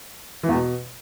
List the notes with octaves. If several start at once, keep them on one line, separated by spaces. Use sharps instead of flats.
E3
E2
B2